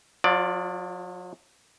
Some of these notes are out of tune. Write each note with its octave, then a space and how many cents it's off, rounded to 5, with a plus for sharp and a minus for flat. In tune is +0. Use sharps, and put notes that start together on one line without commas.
F#3 -45 F4 +0 D5 +5